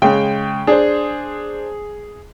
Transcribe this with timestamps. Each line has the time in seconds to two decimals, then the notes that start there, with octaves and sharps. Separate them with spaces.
0.02 C#3 G#3 G5
0.67 D4 G#4 C5